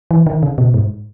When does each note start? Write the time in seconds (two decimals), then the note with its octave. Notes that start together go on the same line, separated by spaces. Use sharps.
0.11 E3
0.27 D#3
0.43 C#3
0.58 B2
0.74 G#2